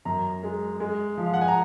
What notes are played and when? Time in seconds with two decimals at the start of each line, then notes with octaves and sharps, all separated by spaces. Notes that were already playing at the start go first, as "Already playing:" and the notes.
0.05 F#2 A#5
0.43 G#3
0.80 G#3
1.17 F3
1.26 F5
1.34 F#5
1.41 G#5
1.48 A#5